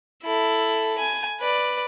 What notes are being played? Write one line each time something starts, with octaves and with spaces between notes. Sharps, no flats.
E4 A4
G#5
B4 D5